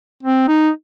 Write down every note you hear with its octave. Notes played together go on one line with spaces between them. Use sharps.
C4
D#4